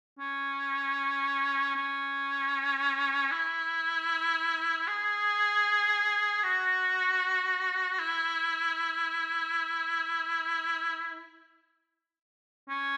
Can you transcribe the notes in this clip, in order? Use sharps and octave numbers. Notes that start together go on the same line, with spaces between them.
C#4
C#4
E4
G#4
F#4
E4
C#4